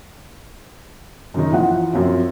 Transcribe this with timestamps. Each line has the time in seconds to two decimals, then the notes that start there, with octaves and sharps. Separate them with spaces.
1.34 F#2 D#3 D#4
1.52 E3 F3 F#5
1.93 F#2 F3 F#3 C4